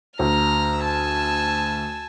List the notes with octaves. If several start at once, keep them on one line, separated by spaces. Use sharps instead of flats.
D2 A#5 F6
G#5 A5 E6